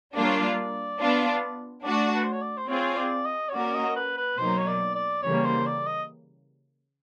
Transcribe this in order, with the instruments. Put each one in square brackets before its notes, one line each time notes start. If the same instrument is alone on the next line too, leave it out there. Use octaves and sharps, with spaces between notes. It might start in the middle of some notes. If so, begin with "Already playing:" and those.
[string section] G3 A#3 D4 F4 [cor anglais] D5
[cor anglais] C#5
D5
[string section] B3 D4 F4
[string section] A3 D4 F#4 [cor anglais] D5
[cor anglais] B4
C5
C#5
D5
C5
[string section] C4 F4 G#4 [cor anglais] C#5
[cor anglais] D5
D#5
C#5
[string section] A#3 C#4 F#4 A#4 [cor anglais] D5
[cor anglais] D#5
B4
B4
[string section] B2 F#3 A#3 D#4 [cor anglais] C5
[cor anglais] C#5
D5
D5
[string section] C#3 E3 G3 A#3 [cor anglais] C#5
[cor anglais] C5
D5
D#5